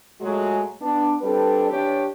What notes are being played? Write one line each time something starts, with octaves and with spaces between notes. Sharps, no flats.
A#2 F#3 G#3 A3 F#4 G#4
B3 D4
G3 C4 D4 A4 B4
E3 D4 G4 C#5